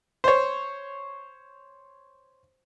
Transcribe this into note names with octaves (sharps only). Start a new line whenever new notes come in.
C5 C#5